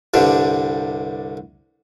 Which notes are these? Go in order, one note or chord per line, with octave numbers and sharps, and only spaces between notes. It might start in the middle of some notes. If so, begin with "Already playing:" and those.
C2 G2 D3